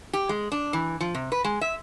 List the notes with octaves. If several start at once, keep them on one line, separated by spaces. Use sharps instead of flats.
G4
G#3
D4
E3
F3
C3
B4
G#3
E5